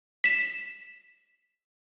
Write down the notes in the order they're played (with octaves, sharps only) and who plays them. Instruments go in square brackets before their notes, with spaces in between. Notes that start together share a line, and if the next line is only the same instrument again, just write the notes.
[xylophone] B6 E7